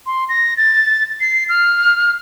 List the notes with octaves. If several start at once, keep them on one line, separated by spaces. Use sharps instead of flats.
C6
A#6
A6
C7
F6